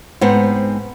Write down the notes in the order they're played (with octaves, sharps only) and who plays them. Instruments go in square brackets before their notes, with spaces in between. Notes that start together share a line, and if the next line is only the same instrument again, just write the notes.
[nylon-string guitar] G#2 B3 C4